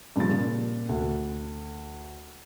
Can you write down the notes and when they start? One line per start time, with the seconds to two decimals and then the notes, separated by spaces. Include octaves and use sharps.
0.16 G2 A#2 C#3 F3 A6
0.31 A#2
0.89 D2